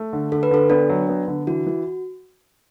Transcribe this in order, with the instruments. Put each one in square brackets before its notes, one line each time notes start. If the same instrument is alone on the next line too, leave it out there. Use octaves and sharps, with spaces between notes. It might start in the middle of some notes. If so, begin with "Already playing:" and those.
Already playing: [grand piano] A3
D3
[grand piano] D3 [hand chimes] A4
[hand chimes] B4
[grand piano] D3 [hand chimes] A4
[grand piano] B3 [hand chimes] D4
[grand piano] F#3
B3
D3
[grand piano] E3 [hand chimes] F#4
[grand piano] E3